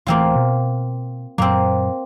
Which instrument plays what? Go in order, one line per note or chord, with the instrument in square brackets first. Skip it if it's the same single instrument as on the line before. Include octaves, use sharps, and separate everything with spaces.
[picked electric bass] D1 E3 A3 [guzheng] A#3 C4 F4
[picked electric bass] B2
[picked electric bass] F#2 A#2 F#3 [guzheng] A#3 C4